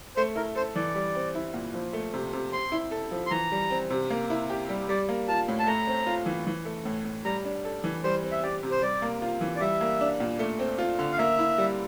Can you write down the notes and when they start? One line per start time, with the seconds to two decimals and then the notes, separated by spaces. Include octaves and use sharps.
0.16 A3 C5
0.36 E4 A#4
0.55 A4 C5
0.75 E3 D5
0.95 G3
1.15 C4
1.35 E4
1.54 A#2
1.74 F3
1.93 A3
2.14 C3
2.33 C3
2.52 C4 C6
2.72 E4
2.91 A4
3.11 F3
3.26 C6
3.31 E3 A#5
3.52 G3
3.70 C4
3.90 C3
4.10 A#3
4.30 E4
4.50 G4
4.69 G3
4.89 G3 D5
5.09 A#3
5.28 F4 A5
5.48 A2
5.59 A5
5.67 A3 A#5
5.87 C4
6.07 F4
6.26 E3
6.47 E3
6.65 A3
6.85 A2
7.05 A2
7.25 G3 A#5
7.45 D4
7.65 A4
7.84 E3
8.04 G3 C5
8.23 C4
8.32 E5
8.43 G4 D5
8.63 C3
8.71 C5
8.82 G3 D5
9.02 A#3
9.22 F4
9.41 E3
9.56 D5
9.61 G3 E5
9.81 A#3
10.01 D4
10.20 A#2
10.39 A3
10.59 C4
10.78 F4
10.99 D3
11.12 F5
11.18 A#3 E5
11.39 E4
11.58 G3